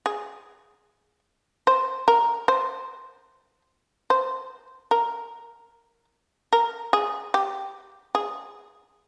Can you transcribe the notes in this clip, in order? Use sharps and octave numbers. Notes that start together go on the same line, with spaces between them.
G#4
C5
A#4
C5
C5
A#4
A#4
G#4
G4
G#4